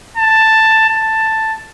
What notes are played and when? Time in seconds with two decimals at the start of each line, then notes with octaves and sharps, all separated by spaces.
0.17 A5
0.89 A5